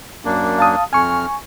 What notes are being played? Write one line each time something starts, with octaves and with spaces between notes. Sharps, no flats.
F#2 A#3 D4
F5 A5 D#6
F2 G#5 C#6 F6